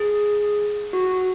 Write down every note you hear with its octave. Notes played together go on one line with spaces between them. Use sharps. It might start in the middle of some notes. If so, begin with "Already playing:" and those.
Already playing: G#4
F#4